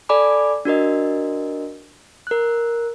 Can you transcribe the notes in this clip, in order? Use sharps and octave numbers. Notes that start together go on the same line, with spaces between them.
A4 D5 G#5 B5 D6
D4 F#4 A#4 D#5
A#4 F#6